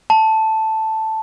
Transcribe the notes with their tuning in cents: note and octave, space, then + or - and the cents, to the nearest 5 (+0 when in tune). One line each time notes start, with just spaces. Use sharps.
A5 +0